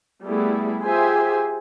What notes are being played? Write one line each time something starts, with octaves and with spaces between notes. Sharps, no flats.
G3 A3 B3 E4 G#4
F4 G4 G#4 C5 E5 G#5